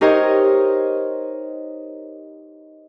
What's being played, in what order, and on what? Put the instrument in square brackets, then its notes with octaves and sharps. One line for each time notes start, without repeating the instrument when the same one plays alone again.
[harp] D#4 G4 A#4 C5 C#5 D#5